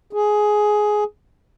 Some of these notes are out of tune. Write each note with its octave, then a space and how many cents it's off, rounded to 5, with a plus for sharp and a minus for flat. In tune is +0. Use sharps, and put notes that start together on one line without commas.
G#4 +10